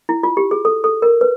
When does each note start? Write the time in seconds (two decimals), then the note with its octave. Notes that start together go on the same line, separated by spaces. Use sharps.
0.09 E4
0.23 F4
0.37 G4
0.51 G#4
0.65 A4
0.84 A4
1.02 A#4
1.21 B4